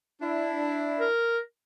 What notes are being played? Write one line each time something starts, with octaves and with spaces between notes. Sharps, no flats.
D4 E4
A#4